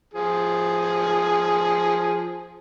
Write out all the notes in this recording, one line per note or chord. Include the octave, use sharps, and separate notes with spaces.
F3 G#4